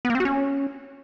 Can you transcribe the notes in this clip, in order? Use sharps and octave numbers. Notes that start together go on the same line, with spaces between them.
B3
A#3
C4
F#4
C#4